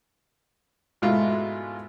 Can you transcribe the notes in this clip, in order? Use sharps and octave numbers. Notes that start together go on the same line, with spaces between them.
G#2 B2 G#3 A3 E4 F4